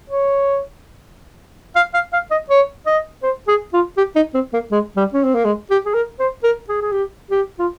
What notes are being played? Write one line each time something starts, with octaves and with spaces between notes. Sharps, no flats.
C#5
F5
F5
F5
D#5
C#5
D#5
C5
G#4
F4
G4
D#4
C4
A#3
G#3
G3
C#4
C4
A#3
G#3
G4
G#4
A#4
C5
A#4
G#4
G#4
G4
G4
F4